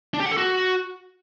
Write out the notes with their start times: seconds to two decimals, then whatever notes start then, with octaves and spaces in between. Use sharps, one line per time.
0.14 D4
0.20 G4
0.26 F#5
0.31 A4
0.37 F#4